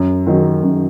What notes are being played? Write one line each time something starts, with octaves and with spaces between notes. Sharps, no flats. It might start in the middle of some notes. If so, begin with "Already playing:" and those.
Already playing: F#2
D#3 F#3 D#4
F#2